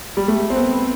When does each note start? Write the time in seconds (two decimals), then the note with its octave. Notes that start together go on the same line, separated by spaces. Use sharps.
0.17 G3
0.28 A3
0.50 C4
0.56 B3